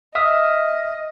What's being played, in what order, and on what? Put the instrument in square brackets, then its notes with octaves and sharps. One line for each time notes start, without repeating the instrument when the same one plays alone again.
[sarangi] D#5 [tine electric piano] E5 D#6 F6